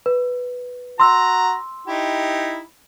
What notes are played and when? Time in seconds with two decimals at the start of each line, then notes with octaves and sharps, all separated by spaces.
0.06 B4
1.00 F#4 A#5 C6 E6
1.87 D#4 E4 G4